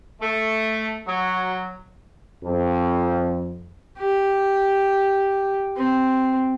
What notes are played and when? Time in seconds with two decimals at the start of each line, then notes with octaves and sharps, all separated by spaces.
0.20 A3
1.06 F#3
2.44 F2
3.98 G4
5.76 C4